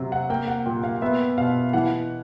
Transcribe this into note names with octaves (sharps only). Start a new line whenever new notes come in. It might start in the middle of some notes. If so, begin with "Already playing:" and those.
Already playing: C3 F#3
F#5
A#3 G5
F#5
A#2 G5
F5
B3 E5
B2 F5
E3 F#5